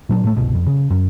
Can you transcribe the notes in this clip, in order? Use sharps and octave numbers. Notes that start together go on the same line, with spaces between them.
A#2 F#3 D4
A2 A3
G1 C2 B2
F2
C#3
F#2